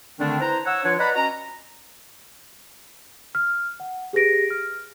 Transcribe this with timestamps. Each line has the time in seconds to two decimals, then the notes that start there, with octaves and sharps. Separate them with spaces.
0.19 D3 D#3 A3 C4 D4
0.40 E4 B4 C5 A#5
0.65 C#5 F#5 E6
0.84 F3 D4 F4 B4 C#5
0.99 B4 D5 D#5 F#5 A#5 B5
1.15 C#4 F#4 D#5 A#5
3.35 F6
3.80 F#5
4.13 G4 G#4 B4 A#6 D7
4.50 F6